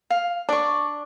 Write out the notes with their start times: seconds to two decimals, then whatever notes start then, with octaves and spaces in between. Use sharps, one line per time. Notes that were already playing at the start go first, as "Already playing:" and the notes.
0.10 F5
0.49 D4 D5 C#6